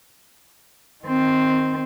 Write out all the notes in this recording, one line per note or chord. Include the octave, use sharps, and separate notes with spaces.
D#3 C4